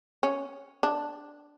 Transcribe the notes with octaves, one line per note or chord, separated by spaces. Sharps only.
C#4
D4